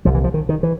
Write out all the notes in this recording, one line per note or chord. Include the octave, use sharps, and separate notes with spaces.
C2 A#2 F3
E3
F3
D#3
D#3
E3